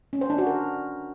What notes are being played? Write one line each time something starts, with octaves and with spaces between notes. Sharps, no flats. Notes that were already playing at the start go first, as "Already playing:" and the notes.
C#4
C5
D4
F#4
A#4